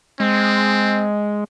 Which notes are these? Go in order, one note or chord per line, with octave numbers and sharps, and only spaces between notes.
G#3 C4